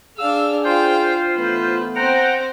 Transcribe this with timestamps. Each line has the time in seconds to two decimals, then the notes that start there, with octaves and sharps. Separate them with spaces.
0.18 D4 G#4 F5 E6
0.64 F4 C5 F5 G5
1.36 E3 A3 B3 B4
1.96 C4 C5 F#5 G5 A#5